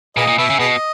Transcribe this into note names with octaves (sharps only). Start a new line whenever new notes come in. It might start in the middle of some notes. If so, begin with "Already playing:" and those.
A#2 G#4 B4 D#5
A#2
B2 B4 E5
C#3
B2 G#4 B4 D#5